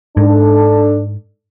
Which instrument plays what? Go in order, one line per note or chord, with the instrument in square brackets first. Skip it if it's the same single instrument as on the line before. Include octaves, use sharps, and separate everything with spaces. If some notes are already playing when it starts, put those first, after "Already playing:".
[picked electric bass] G#2 [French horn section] D4 A4